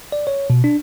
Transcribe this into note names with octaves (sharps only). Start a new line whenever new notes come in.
D5
C#5
B2
D4